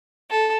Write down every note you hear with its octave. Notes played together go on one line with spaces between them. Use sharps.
A4